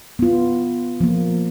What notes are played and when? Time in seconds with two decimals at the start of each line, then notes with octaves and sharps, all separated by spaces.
0.19 B3 F4
1.01 F3 A#3